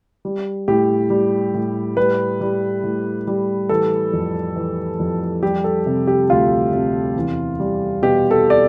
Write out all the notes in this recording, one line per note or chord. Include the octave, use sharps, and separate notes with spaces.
G3
A2 G4
G3
A2
G3 B4
G3
A2
G3
E3 A4
F2
E3
F2
G3 G4
A4
C3
G4
D2 F4
C3
E2
G3
B2 G4
A4
D5